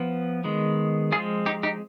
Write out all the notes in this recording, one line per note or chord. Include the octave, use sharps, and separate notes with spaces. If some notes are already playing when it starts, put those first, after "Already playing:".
Already playing: F3 B3
D#3 G#3 B3
F3 G#3 C4 F4 G#4
D#4 G4
D#4 G4